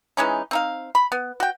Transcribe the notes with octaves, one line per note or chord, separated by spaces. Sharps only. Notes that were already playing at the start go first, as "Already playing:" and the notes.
E3 G#3 C#4 D#4
C4 D#4 F5
B5
B3
F#4 G5